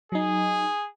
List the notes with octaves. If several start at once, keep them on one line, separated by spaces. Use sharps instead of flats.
F#3 D#4 G#4